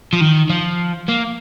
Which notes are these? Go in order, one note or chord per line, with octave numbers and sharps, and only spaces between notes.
F3
D#3
F3
A#3